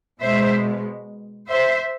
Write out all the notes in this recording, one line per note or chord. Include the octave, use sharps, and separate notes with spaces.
B2 G#3 C5 E5
C5 E5